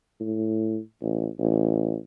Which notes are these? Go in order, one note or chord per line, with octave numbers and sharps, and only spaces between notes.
A2
A1
A1